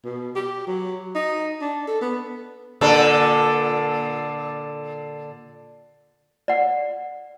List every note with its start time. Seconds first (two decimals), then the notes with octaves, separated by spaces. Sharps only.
0.05 B2
0.35 G4
0.67 F#3
1.15 D#4
1.61 D4
1.87 A4
2.01 B3
2.81 A#2 D3 A4
6.48 D5 F#5